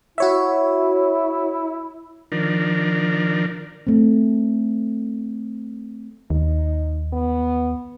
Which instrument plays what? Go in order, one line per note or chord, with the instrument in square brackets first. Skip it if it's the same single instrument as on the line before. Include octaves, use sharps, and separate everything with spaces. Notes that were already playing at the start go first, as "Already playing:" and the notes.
[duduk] E4 [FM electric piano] F#4 C#5 E5
[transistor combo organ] D#3 F3 D4 A#4
[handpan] A3 C4
[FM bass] D#2 [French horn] D#4
[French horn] B3